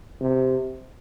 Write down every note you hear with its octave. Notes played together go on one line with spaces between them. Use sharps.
C3